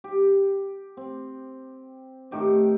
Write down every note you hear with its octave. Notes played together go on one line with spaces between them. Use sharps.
G4
C4
A2 D#3 G4 D#5